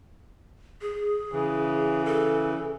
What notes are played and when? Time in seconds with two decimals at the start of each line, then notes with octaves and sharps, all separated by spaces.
0.82 G#4
1.32 C#3 E3
2.06 A4